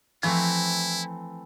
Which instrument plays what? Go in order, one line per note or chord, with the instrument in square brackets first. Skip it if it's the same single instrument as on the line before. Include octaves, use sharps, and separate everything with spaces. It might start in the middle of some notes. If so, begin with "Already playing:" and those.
[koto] E3 A3 C4 [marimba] F3 C#6 [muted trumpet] E4